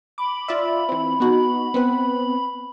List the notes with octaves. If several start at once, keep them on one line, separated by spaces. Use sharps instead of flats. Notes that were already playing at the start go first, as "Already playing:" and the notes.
B5 D6
F4 D5 E5
E3 C4
B3 D#4 F#4
B3 C4 B4